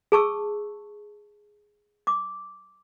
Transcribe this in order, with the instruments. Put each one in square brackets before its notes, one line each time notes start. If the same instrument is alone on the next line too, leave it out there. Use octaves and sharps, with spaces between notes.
[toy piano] G#4 A5 C#6 E6
D6